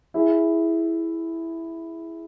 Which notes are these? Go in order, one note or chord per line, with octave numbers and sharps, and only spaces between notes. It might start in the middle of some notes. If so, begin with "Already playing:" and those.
E4 G#4